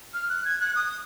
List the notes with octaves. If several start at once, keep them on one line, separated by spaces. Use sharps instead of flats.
F6
F#6
G#6
F#6
D#6